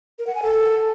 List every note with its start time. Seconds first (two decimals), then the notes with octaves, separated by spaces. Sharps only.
0.19 A#4
0.27 F#5
0.35 G#5
0.43 A4